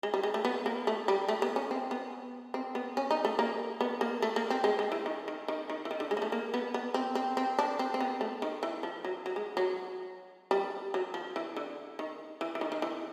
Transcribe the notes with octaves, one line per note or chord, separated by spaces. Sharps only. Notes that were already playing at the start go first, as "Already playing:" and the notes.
G#3
G3
G#3
A3
B3
A#3
A3
G3
A3
B3
C#4
C4
B3
C4
B3
C#4
D#4
A3
A#3
B3
A#3
A3
A#3
C4
G#3
G#3
E3
D#3
D#3
D#3
D#3
E3
D#3
D3
G#3
A#3
A3
A#3
B3
B3
C4
C4
C4
D4
C4
C4
B3
A3
D#3
E3
F3
F#3
F#3
G#3
F#3
G3
F#3
F3
E3
D3
D#3
E3
E3
D#3
D#3
E3